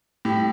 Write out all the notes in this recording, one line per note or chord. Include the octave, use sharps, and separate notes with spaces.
A2 G4